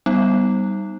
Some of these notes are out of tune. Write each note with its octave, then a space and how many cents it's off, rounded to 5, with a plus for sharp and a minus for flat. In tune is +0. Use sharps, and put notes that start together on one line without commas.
G3 -10 B3 +0 D#4 +0